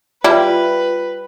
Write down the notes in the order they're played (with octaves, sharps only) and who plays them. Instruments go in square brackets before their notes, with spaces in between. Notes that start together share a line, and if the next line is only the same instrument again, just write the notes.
[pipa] G3 [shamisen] E4 [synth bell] F4 [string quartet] B4